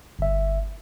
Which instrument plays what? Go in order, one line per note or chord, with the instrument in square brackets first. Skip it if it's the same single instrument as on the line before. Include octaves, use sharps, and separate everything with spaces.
[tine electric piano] G1 E5